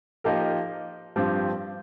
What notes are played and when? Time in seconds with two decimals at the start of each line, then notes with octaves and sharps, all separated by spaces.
0.24 F3 A#3 D#4 G4 A#4
1.16 G2 F3 C4 G4